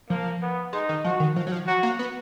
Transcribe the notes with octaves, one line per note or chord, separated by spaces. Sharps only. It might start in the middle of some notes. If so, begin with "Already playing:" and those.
F3 A#3
B3
G#3 D#4
D#3
F3 F#4
D#3
F3
F#3
F3
F#3 F#4
A#3
B3